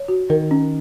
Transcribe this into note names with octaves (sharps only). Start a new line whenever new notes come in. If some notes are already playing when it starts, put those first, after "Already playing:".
Already playing: C#5
F#4
D#3 A#4
C#4